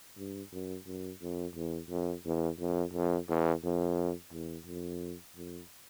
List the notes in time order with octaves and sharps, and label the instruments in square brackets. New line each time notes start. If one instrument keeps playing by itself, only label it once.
[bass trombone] G2
F#2
F#2
F2
E2
F2
E2
F2
F2
E2
F2
E2
F2
F2